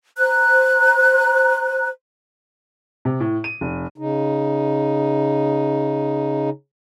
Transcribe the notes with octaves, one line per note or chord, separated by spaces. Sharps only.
C5 A#5 F#6
C3
A2
D#7
F1
C#3 D#4